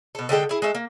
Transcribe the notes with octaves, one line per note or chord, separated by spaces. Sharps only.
B2 A4
D3 G#3 G4 A4
E4 G#4
G#3 A3 E5
A#3